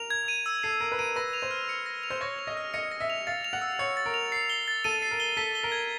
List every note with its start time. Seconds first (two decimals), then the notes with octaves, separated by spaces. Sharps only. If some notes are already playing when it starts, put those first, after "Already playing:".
Already playing: A#4 F7
0.10 G#6
0.28 D#7
0.46 E6
0.63 A4 C7
0.80 A#4 G#6
0.92 B4
0.98 A#4 D#7
1.16 B4 A#6
1.33 F7
1.42 C5
1.51 F6
1.69 C#7
1.86 A#6
2.03 F7
2.10 C5
2.21 C#5 A#6
2.39 F7
2.47 D#5
2.57 F6
2.74 D#5 C#7
2.91 A#6
3.00 E5
3.10 F7
3.27 F5 A6
3.44 F7
3.53 F#5
3.62 E6
3.79 C#5 C#7
3.97 A6
4.06 A#4
4.14 F7
4.32 C7
4.50 G7
4.68 A6
4.84 A4 D#7
5.02 C7
5.11 A#4
5.20 G7
5.37 A4 B6
5.55 G7
5.63 A#4
5.72 G#6